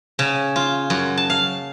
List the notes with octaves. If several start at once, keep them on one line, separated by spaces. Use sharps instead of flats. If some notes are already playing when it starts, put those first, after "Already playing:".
C#3
F4
F#2
A5
F5